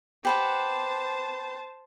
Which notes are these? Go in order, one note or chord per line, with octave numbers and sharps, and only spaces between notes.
G4 B4 C5 F#5 A5